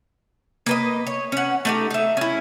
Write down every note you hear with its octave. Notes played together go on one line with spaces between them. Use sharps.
A#3 B4 D#5
C#5
C#4 F#5
A3 D#4 G4
D#4 E5
C#4 E4